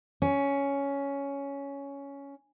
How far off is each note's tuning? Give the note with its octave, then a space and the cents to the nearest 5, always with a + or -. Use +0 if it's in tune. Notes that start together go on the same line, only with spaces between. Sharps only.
C#4 +10